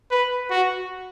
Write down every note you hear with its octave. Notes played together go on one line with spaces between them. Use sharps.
B4
F#4